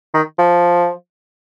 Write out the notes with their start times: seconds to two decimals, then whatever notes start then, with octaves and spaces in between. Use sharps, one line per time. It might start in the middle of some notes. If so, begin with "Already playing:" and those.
0.14 D#3
0.38 F3